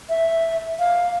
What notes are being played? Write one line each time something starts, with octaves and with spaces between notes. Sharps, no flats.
E5
F5